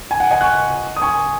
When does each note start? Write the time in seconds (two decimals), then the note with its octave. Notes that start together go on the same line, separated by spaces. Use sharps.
0.11 G#5
0.20 F#5
0.31 D#5 G#5
0.41 C#6 F#6
0.96 D#6
1.01 G#5 C#6